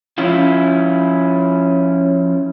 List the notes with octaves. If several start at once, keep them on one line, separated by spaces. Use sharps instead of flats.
F3 C#4 E4 F4